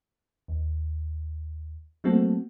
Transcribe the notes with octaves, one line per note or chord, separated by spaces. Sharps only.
D#2
F#3 A3 A#3 C4 F#4 A4